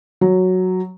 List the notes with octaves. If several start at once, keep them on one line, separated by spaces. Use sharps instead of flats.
F#3